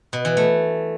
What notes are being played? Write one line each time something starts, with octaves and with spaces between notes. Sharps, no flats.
B2
E3
A3